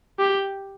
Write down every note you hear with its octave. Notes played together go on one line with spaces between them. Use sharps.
G4